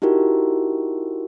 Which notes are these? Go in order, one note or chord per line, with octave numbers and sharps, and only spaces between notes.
D#4 E4 F#4 G4 A#4